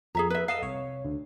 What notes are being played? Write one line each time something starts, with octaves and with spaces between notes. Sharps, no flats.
F2 G#4 E5 A#5
B4 E5
A4 D#5 F5 E6
C2 C#5
D2